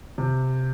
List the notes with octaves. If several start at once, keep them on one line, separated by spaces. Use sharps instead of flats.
C3